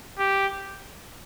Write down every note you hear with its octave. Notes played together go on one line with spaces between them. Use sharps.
G4